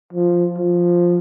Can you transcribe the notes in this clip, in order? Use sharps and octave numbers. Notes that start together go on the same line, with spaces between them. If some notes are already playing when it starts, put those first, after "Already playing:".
F3
F3